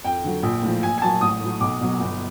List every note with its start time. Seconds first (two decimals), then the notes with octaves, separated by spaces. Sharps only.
0.04 F2 G5
0.24 D3 F#3
0.43 A#1
0.62 A2 F3
0.83 A#1 G#5
0.98 G#5
1.02 A#2 F#3 A5
1.21 A1 D#6
1.41 A2 F#3
1.60 B1 D6
1.81 B2 F#3
2.00 G1